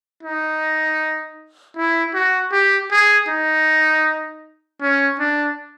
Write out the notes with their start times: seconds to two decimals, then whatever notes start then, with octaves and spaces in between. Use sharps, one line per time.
0.23 D#4
1.77 E4
2.14 F#4
2.52 G4
2.91 G#4
3.28 D#4
4.82 C#4
5.20 D4